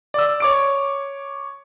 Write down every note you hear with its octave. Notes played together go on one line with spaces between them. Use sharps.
D5 E6
C#5 D6 D7